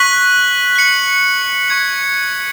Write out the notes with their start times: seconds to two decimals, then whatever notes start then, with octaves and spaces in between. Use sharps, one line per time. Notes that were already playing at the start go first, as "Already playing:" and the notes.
Already playing: C#6 F#6 B6 F#7
0.76 F#6 C#7 F#7
1.69 C#6 G#6 C#7 F#7